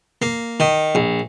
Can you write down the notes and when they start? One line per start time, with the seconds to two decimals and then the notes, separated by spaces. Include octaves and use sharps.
0.22 A#3
0.60 D#3
0.95 A#1